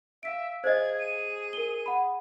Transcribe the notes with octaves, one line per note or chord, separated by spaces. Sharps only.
E5 F5 B6 D7
G#4 C5 D#5 G#6
D#7
A#4 G7
F#5 B5